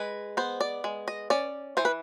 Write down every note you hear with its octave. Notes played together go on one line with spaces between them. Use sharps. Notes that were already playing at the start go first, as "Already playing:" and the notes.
Already playing: G#3 B4
B3 C5
D5
G#3
D#5
C#4 D5
E3 C5
B4